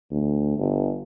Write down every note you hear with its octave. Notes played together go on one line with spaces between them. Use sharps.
D2
G1